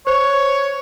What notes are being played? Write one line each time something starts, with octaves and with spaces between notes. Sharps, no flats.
C5 C#5